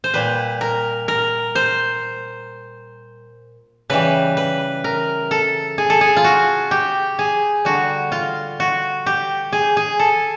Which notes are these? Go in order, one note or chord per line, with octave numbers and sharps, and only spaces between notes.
C5
A#2 G3 B4
A#4
A#4
C5
C#3 E3 G3 B4
B4
A#4
A4
G#4
A4
G#4
F4
F#4
G4
G#4
D3 G3 F#4
F4
F#4
G4
G#4
G#4
A4